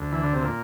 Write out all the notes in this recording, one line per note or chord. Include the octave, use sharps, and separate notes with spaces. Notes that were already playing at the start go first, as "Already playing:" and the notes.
Already playing: D2
E3
D3
C3
A#2